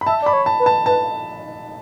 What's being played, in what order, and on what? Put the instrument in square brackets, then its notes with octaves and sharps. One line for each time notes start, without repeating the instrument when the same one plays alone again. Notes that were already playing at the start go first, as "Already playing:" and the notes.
[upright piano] B5
[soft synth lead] E5 [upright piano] A5
[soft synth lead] D5 [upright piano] B5
[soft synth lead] C#5
[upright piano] A5
[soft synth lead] B4
[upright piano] A5
[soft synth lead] B4 [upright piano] A5